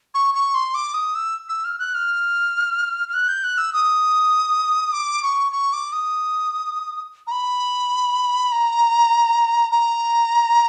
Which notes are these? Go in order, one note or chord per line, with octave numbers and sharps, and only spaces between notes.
C#6
C#6
C6
D6
D#6
E6
E6
F6
F#6
F6
F6
F#6
G6
F#6
E6
D#6
D6
C#6
C#6
D6
D#6
A#5
B5
A#5
A#5